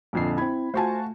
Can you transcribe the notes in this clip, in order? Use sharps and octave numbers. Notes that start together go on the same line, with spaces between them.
A#1 F2 D3 F4 C7
C4 E4 B5 G#6
A3 F4 F#4 C5 G#5 A5